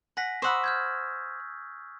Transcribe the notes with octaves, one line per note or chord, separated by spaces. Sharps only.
F#5 G#5 A#6 B6
C5 F#5 B5 C#6 D#6 E6
F6 G6 G#6